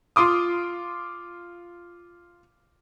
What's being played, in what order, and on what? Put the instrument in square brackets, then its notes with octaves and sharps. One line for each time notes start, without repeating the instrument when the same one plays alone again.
[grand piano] F4 C6 D6 D#6